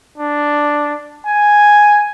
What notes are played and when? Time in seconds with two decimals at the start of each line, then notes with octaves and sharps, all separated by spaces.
0.18 D4
1.27 G#5